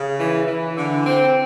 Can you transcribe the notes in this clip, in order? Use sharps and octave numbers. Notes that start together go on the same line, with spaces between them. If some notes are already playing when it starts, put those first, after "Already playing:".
Already playing: C#3
E3
E3
D3
C4